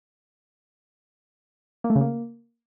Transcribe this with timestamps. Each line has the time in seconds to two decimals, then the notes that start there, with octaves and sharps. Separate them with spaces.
1.84 A#3
1.90 A3
1.95 C#3
2.01 A#3